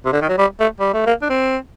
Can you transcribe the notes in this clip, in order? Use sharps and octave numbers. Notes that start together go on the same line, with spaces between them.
C3
D3
D#3
F#3
G3
A3
G3
A3
A#3
D4
C4